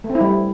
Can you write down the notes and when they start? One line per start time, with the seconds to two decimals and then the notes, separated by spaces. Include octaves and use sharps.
0.04 A3
0.10 C4
0.15 E4
0.21 G3